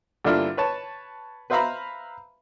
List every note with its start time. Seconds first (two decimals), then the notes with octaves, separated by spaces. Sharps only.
0.25 G2 D3 A#3 D4 E4 F4
0.57 B4 C#5 A5
1.50 B4 C5 E5 F5 A#5 B5